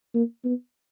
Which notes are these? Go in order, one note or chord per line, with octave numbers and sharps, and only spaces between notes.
A#3
B3